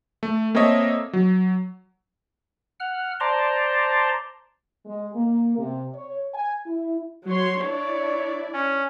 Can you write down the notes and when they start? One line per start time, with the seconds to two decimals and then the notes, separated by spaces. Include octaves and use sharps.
0.23 A3
0.55 A#3 C4 A4 C#5 D#5 E5
1.13 F#3
2.80 F#5 F6
3.20 C5 D5 A5 A#5 C6
4.86 G#3
5.15 A#3
5.58 C3
5.94 C#5
6.34 G#5
6.66 E4
7.27 F#3 C#5 C6
7.62 D4 E4 C#5 D5
8.54 C#4